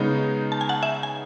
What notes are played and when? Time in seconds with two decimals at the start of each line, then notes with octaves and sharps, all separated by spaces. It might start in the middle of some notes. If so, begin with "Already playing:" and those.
Already playing: C#3 G#3 B3 D#4
0.52 A5
0.61 G#5
0.69 F#5 A5
0.82 E5 G#5
1.03 G#5